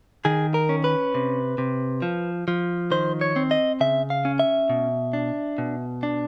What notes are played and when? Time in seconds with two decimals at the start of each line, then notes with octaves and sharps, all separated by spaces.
0.25 D#3 G#4
0.54 A#4
0.69 C#4
0.84 B4
1.15 C3
1.58 C3
2.02 F3
2.48 F3
2.91 D#3 C5
3.21 C#5
3.36 C4
3.51 D#5
3.81 C#3 E5
4.10 F5
4.25 C#4
4.39 E5
4.69 B2
5.13 D4
5.58 B2
6.03 D4